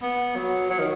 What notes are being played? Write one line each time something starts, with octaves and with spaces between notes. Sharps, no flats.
B3
F#3
F#3
D#3